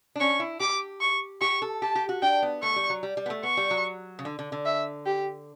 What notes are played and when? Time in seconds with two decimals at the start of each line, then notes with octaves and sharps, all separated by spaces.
0.16 D4
0.20 C#4 C#6
0.40 E4
0.60 G4 D6
1.01 C#6
1.41 G4 C#6
1.62 A4
1.82 G4 A5
1.95 G4
2.09 F#4
2.22 D4 G5
2.42 B3
2.63 A3 C#6
2.76 G3
2.90 F#3
3.03 G3
3.17 G3
3.26 B3
3.30 A3
3.43 B3 C#6
3.57 G3
3.70 F#3
4.19 C#3
4.25 D3
4.39 D3
4.52 D3
4.65 E5
5.06 G4